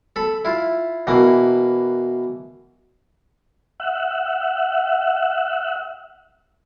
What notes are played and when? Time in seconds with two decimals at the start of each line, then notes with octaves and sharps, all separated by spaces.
0.16 A4 B5
0.45 E4 F4
1.07 B2 E3 A#3
3.80 E5 F#5